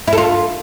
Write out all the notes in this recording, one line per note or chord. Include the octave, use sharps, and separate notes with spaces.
E4
A4
F4